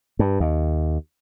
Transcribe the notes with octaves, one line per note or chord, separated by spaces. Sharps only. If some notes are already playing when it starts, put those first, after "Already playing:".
G2
D#2